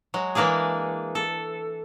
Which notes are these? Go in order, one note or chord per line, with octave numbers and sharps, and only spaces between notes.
F#3 G#3
E3 G#3 A#3 D4 G#4
A4